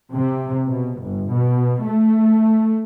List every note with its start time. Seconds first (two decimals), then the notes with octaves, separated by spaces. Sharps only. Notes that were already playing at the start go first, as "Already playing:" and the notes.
0.13 C3
0.65 B2
1.02 G1
1.32 B2
1.85 A3